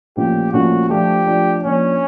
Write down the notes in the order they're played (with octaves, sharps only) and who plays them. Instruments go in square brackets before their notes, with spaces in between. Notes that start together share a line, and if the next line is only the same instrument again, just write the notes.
[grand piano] A#2 F3 A3 C#4 F4 [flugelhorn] G4
[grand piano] A#2 F3 A3 C#4 F4 [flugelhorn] F#4
[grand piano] F3 A3 D4 F4 [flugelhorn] G4
[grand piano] F3 A3 D4 F4
[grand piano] F3 A#3 D4 [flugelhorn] C#4